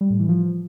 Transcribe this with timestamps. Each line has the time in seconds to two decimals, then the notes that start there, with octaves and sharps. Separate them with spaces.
0.01 G3
0.10 A2
0.19 E3
0.29 F3